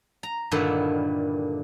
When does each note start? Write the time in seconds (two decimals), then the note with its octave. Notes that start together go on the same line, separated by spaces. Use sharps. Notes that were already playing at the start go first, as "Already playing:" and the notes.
0.23 A#5
0.51 G2 A#2 D3 D#3 A3 E4